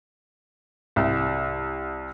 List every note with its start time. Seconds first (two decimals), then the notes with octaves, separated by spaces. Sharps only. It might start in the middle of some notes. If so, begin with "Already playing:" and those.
0.96 C2